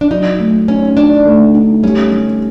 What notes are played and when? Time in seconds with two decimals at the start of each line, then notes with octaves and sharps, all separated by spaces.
0.01 D4
0.10 F#3 D#4
0.39 A3
0.68 C#4 D#4
0.96 D4 D#4
1.26 A3
1.55 D#4
1.83 G3 C#4
2.12 G3